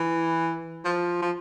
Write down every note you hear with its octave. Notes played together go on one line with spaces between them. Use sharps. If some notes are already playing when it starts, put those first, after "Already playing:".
Already playing: E3
F3
F3